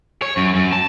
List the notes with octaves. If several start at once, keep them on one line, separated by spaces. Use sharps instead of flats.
C#5
F#2
F#2
A5